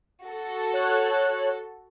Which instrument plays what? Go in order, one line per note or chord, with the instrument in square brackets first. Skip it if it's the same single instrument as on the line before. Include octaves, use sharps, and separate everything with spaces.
[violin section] F#4 A4
[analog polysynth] C#5 F#6